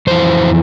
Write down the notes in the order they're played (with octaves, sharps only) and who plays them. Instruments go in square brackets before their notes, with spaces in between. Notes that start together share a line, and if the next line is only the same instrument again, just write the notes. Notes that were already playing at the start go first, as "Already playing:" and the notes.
[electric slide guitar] F2 E3 C5